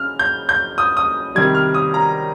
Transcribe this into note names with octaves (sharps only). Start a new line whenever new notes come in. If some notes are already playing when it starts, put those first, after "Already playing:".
Already playing: C#3 F6
G6
G6
D#6
D#6
C3 D#3 G3 G#6
F6
D#6
A#5